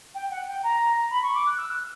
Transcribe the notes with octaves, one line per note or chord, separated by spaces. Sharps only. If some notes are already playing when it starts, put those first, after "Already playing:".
G5
F#5
G5
A#5
B5
C#6
D6
F#6
E6
F#6